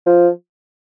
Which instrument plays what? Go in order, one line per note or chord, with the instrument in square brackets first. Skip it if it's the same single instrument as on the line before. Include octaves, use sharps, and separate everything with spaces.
[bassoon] F3